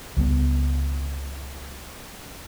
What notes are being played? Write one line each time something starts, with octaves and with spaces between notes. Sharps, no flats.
C#2 G3 B3